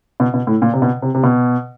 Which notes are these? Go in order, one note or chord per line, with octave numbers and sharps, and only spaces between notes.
B2
B2
A2
A#2
C3
B2
C3
C3
B2